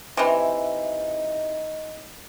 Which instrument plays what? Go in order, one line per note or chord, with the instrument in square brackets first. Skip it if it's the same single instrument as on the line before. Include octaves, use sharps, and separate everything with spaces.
[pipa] C3 E3 [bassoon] D#4